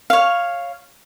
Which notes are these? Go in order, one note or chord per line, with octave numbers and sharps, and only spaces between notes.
C#5 F5